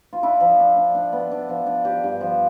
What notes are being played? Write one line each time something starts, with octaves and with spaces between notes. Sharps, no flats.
F4
D4 E4
F3
D4
D4
D4
B3
D4
F3
D4
D4 G4
G2
F3